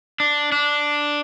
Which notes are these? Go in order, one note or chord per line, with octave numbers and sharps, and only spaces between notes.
D4
D4